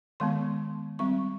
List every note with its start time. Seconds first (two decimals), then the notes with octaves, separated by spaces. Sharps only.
0.20 D#3 G#3 B3 C6
0.99 G3 C4 C#6